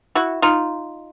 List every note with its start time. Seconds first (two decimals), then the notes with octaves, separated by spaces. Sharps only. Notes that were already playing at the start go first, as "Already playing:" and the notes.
0.15 E4 F#4
0.42 D#4 F4